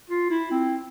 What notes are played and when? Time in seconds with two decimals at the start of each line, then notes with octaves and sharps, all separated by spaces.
0.10 F4
0.31 E4
0.51 C4